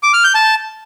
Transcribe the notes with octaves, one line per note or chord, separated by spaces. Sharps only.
D6
F6
G6
A5